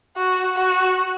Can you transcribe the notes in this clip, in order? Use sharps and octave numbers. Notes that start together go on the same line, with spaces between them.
F#4
F#4